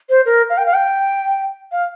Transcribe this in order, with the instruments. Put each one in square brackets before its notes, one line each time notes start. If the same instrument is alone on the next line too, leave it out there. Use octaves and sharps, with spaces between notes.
[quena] C5
A#4
F5
G5
F5
G5
F5